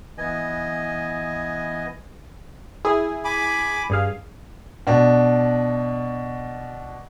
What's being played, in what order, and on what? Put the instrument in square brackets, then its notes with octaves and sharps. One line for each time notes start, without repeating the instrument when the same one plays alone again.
[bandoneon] E3 B3 D#5 G#5
[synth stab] E4 G#4
[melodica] G#5 B5 D6
[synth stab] G2 G#4 F5
[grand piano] B2 D4